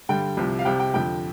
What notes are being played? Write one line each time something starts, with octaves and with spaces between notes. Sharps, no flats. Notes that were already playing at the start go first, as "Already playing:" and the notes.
G2 D3 G3 G5
C2 C3 F3
F5
C2 C3 G3 G5
G5
F2 D3 F3 G5